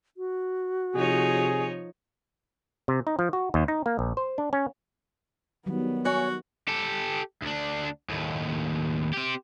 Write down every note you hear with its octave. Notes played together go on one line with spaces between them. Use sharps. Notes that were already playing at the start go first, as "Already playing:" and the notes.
F#4
C3 F3 D#4 G#4 C#5
C3
D#4
F3
F#4
D#2
D#4
A#3
A#1
C5
D4
C#4
D#3 F#3 G3 B3
F#4 C#5 G#5
G4 A4
D2 D4
D#2 A2
C4 G4